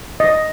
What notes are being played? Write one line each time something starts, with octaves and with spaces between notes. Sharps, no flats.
D#5